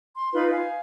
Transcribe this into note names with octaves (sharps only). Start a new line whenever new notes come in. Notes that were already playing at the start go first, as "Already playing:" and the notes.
C6
D#4 F4 B4 B5
F5 G#5